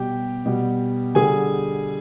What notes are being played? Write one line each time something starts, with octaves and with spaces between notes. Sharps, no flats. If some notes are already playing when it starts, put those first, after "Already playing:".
Already playing: B2 G3 G4 G5
B2 G3
D3 G3 G#4 G#5